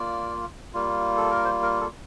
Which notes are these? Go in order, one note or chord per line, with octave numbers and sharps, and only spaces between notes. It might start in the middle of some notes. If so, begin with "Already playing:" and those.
Already playing: A#3 F4 D5
G3 A#3 F4
A4
A#4
C5
A#4
A4